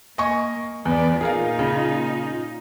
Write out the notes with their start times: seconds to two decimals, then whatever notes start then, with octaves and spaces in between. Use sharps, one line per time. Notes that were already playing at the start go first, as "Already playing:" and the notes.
0.18 A#3 D#5 G#5 C#6
0.85 E2 B3 D5
1.21 A#2 D#4 F4 G#4 A#4 F5
1.59 C#3